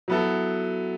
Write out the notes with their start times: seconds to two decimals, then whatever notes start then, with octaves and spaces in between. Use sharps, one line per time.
0.08 F#3 B3 E4 A4